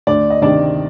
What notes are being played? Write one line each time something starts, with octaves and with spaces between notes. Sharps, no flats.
D2 D4 D5
D#5
C3 D#3 D4 D5